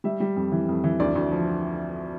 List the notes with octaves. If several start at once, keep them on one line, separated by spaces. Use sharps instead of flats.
G3 E5
G3
F2
E3
F2
E3
D2 D5
D2
F3